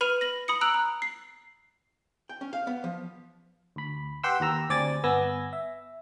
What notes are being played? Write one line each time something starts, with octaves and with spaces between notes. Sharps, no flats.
B4 B5 F6 D#7 F7
A#6 F#7
B5 D#6 C#7
A#5 E6 F#6 D7 F7 F#7
A#5
C7
G5
C#4
F5
B3
F3
D2 B5
G4 B4 F#5 G5 C6 E6
D#2 G4 A#5 E6
D2 C4 D5 G#5 D6 A6
G1 B3 G#5 E6 A#6
E5